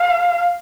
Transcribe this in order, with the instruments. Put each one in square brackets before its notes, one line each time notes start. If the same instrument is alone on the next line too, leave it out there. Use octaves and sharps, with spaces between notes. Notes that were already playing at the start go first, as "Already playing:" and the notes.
Already playing: [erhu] F5